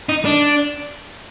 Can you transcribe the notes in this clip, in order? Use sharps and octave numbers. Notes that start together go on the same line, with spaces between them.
D#4
D4